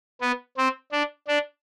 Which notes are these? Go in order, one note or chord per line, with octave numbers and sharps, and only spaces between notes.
B3
C4
D4
D4